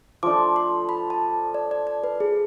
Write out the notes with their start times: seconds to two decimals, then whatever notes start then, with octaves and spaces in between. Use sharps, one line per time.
0.23 F3 A3 D4 D6
0.56 C6
0.89 B5
1.10 A5
1.54 D5
1.71 D5
1.87 D5
2.04 B4
2.20 G#4